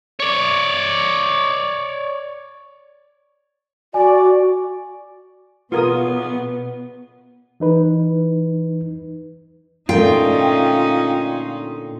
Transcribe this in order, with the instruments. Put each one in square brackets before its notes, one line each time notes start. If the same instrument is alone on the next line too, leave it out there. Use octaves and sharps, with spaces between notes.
[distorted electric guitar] C#5 D5
[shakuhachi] F#4 [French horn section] D5 [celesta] G#5
[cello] B2 [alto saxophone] B3 [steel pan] F4 A#4 D#6
[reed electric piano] E3 D#4 B4
[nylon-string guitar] A#2 D3 A3 [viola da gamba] C#4 D#4 [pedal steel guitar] F4 [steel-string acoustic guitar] G5